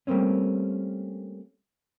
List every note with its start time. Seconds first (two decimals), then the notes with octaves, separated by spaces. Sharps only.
0.07 G3 A3 A#3 C4 C#4